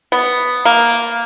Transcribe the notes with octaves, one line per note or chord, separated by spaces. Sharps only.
B3
A#3